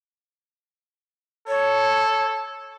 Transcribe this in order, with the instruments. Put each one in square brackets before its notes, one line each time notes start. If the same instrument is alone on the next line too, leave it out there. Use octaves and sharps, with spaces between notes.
[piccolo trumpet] A4 [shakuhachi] C#5